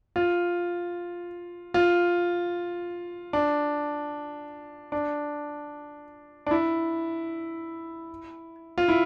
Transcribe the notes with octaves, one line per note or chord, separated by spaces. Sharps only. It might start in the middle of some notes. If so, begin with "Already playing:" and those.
F4
F4
D4
D4
D4
E4
F4
E4